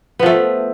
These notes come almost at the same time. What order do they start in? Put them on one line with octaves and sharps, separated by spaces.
B3 F3 A3